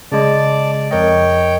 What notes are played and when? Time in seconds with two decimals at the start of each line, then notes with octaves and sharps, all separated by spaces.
0.12 C#3 G#3 D5 A5
0.91 F2 A#4 C#5 D#5 G5